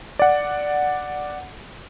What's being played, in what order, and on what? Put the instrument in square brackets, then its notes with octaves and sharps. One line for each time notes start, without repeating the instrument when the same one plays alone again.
[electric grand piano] D5 F#5